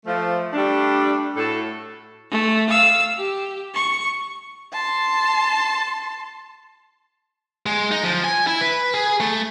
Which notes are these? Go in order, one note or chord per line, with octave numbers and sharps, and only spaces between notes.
F3 A3
G3 A3 D4
A2 F#4 A4
A3
F5 E6
G4
C#6
A5 C6
G#3
D#4
F3
G#5
E4
B4
G#4
A3